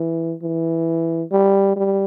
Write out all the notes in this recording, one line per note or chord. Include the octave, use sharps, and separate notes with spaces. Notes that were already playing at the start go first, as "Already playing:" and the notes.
Already playing: E3
E3
G3
G3